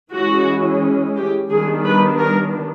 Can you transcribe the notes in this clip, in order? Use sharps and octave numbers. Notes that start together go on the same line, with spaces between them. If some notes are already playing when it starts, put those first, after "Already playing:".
E3 G#3 C#4 F#4
G4
D#3 G3 B3 D4 G#4
B4
A#4